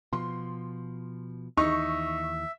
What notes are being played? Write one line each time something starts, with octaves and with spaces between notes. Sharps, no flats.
B2 F3 C6
D#2 E3 D#4 E5 C#6